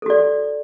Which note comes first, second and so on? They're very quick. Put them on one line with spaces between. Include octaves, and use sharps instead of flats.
A4 F#4 D5